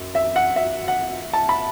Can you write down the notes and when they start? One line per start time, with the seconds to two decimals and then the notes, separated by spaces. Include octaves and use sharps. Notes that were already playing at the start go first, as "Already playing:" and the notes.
Already playing: F#2
0.15 E5
0.36 F#5
0.56 E5
0.88 F#5
1.33 A5
1.49 B5